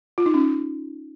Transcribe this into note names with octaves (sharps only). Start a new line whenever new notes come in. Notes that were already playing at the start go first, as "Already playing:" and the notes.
F4
D#4
C#4